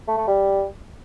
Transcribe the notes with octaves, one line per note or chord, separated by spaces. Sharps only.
A3
A3
G3